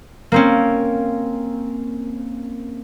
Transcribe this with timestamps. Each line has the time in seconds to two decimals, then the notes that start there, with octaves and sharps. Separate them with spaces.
0.32 A#3 C4 C#4